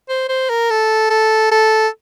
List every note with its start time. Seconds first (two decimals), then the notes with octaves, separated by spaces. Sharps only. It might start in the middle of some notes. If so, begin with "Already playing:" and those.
0.09 C5
0.29 C5
0.49 A#4
0.70 A4
1.10 A4
1.51 A4